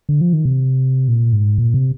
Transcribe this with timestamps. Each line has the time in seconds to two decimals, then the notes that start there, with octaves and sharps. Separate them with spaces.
0.09 D3
0.21 F3
0.33 D#3
0.45 C3
1.08 A#2
1.33 G#2
1.58 A#2
1.74 C3